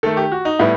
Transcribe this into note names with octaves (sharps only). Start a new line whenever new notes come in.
D#3 A3 A4
G4
F#4
D#4
A2 G3 B3 E4